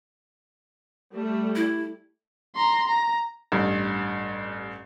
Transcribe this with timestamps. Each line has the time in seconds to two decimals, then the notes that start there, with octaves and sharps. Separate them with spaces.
1.14 G3 A3
1.55 E4
2.56 A#5 C6
2.88 A#5
3.52 A1 G2